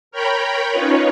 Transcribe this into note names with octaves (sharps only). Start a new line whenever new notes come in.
A#4 C#5 G5 A#5 B5
C#4 D#4 F4 B4 C#5